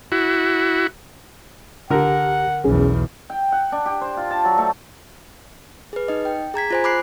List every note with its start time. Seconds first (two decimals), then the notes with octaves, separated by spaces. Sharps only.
0.12 E4 F#4
1.90 C2 D3 G4 A#4 F#5
2.64 B1 E2 C#4 G#4
3.30 G5
3.52 F#5
3.72 D4
3.86 G4
4.01 C5
4.17 F4
4.30 A5
4.45 F#3
4.58 A3
5.93 G#4 B4
6.08 D#4 D#5
6.25 G5
6.54 G#4 A#5 G#6 B6
6.71 F4 C5 G#5
6.84 B5 D6 F#6 C7